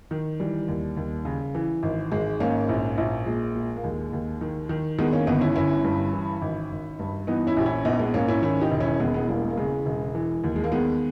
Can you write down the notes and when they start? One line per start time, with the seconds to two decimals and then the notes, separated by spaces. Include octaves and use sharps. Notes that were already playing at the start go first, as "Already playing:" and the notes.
0.11 D#3
0.40 E3 G3
0.68 D#2
0.97 D#2
1.25 C#3
1.55 E3
1.83 G#1
2.11 G#1 G#3
2.40 G#2 A#3 C#4
2.69 A#1
2.98 A#1
3.26 A#2 G#3
3.55 A#2
3.77 A#3
3.84 D#2 G#3
4.13 D#2
4.41 D#3
4.69 D#3
4.99 D#3 G#3 B3
5.13 A#3 C#4
5.27 G1 B3 D#4
5.41 C#4 E4
5.55 G1 C#4 E4
5.84 G2
6.13 E3
6.42 G#1
6.71 G#1
7.00 G2
7.27 E3 B3 D#4
7.47 C#4 E4
7.57 A#1 G4
7.66 C#4 E4
7.85 A#1 B3 D#4
7.99 G#3 B3
8.14 G#2 A#3 C#4
8.28 C#4 E4
8.42 D#3 C#4 E4
8.61 D#4 G4
8.71 E1
8.80 C#4 E4
9.00 E1 G#3 B3
9.14 G#3 B3
9.28 E2 G3 A#3
9.43 G#3
9.50 A#3
9.57 C#3 G#3
9.86 E1
10.15 E3
10.44 D#2
10.56 G#3
10.64 A#3
10.72 D#3 G#3 B3